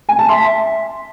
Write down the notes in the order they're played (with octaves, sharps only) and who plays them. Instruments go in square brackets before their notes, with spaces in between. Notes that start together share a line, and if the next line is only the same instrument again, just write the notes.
[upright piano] G#5
A5
[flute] E5 [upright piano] C6